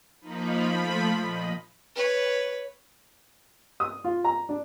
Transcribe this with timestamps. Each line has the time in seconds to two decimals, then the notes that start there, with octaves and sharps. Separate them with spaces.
0.21 F3 A#3 D#4 B5
0.77 A3
1.22 A#2 D#5
1.96 B4 C#5
3.80 D#6
4.04 F4
4.24 A#5
4.49 D4